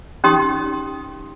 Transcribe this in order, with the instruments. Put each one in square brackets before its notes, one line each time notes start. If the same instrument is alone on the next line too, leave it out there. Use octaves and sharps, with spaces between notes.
[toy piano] C#4 D#4 G4 G5 C6 D#6